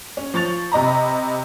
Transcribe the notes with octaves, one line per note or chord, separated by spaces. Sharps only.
C#4
F3 C#6 A6 F7
C3 D#5 A#5 B5